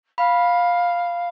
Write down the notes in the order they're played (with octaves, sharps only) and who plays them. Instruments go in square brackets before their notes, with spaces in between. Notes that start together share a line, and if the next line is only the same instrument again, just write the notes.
[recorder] F5 [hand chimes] B5